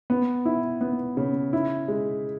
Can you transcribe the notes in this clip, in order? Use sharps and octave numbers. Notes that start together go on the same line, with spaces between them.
B3
E4
B3
C#3
E4
G#3